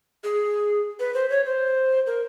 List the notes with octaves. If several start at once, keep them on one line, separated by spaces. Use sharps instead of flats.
G#4
B4
C5
C#5
C5
A#4